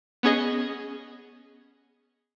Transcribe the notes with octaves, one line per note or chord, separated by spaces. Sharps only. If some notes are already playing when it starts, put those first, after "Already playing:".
B3 C#4 G#4 D#5